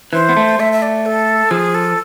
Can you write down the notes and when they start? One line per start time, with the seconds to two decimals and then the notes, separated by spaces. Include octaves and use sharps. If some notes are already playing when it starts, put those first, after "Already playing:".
0.13 E3 C5
0.29 B3
0.37 A3
0.59 A3 E5
0.72 E5
0.82 D5
1.06 A4
1.51 F3 G#4
1.74 A4